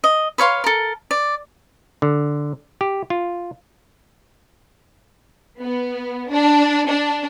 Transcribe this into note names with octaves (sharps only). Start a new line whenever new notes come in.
D#5
B4 C#5 F5 C6
A4 A#4
D5
D3
G4
F4
B3
D4
D4